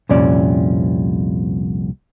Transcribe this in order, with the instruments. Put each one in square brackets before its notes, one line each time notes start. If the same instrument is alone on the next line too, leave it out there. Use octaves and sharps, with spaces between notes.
[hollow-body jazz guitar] C2 F2 A#2 C#4 D5